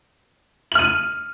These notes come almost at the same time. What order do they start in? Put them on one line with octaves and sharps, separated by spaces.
F#7 F6 D#7